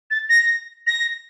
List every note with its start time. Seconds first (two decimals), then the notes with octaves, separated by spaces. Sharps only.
0.10 A6
0.29 A#6
0.86 A#6